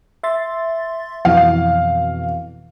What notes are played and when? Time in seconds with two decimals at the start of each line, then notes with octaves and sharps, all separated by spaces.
0.23 E5 C6 A6
1.25 F2 B2 E3 F5